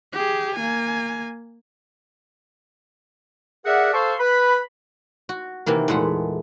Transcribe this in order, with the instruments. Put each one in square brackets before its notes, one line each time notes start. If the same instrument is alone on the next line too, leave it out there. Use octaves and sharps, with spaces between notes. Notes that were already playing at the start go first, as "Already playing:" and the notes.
[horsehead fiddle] G4 G#4
A#3 G#5
[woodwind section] G#4 A#4 D5 E5 F#5
A4 C5 F5 A5 C6 C#6
B4 B5
[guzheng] F#4
C3 D#3 E3 A#3
E2 A#2 G#3 A3 F#5